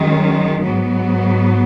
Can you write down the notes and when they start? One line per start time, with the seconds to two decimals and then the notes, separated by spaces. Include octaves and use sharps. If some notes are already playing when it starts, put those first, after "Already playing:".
Already playing: F#2 D#3 G#3
0.63 G#2 F#3 B3